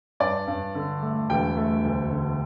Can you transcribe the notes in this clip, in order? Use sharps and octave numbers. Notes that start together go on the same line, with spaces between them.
G2 D5
G2
D3
A3
E1 G5
A3
D2
D3